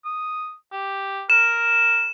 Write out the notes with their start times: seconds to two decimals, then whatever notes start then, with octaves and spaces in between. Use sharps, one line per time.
0.05 D#6
0.72 G4
1.30 A#4 E7